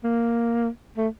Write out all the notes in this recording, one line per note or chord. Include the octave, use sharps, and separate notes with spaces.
A#3
A3